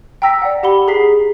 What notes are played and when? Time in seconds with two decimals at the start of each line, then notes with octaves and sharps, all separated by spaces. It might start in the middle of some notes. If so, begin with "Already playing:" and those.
0.22 G5 A#5 E6 A#6 B6
0.42 D5 F#5
0.63 G4 F#5 B5 G7
0.88 G#4 A#5 B6 C7